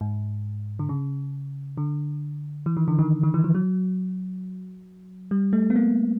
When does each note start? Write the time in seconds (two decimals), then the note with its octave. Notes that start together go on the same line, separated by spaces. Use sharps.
0.01 G#2
0.79 D3
0.89 C#3
1.77 D3
2.66 E3
2.77 D#3
2.88 D3
2.99 D#3
3.23 D#3
3.34 E3
3.44 F3
3.55 F#3
5.31 G3
5.53 A3
5.70 B3
5.76 A#3